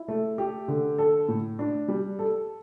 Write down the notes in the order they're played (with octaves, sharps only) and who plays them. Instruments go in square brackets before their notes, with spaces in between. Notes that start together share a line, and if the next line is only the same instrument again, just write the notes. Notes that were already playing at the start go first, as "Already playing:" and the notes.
Already playing: [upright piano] E4
A3
G4
D3
A4
A2
D4
G3
A4